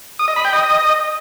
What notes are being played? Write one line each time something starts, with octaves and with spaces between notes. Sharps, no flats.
D#6
D#5
B5
G5
D#5